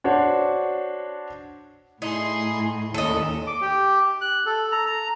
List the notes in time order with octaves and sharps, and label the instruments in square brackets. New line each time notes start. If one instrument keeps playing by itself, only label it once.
[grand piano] D4 F#4 C5 C#5
[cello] A2 [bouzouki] D#4 [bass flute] E4 [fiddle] G#4 C6
[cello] D#2 [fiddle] C#4 [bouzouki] A4 D#5
[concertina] D6
G4
F#6
A4
A#5
A#5